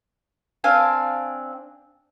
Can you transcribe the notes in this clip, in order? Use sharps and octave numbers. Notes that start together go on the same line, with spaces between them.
C4 D4 F5 G#5